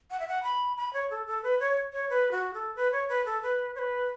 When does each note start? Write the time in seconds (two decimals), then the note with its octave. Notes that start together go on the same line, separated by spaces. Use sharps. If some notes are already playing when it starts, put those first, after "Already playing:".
0.11 F#5
0.20 E5
0.28 F#5
0.43 B5
0.77 B5
0.93 C#5
1.10 A4
1.27 A4
1.43 B4
1.60 C#5
1.93 C#5
2.09 B4
2.31 F#4
2.54 A4
2.76 B4
2.92 C#5
3.09 B4
3.25 A4
3.42 B4
3.75 C#5
3.79 B4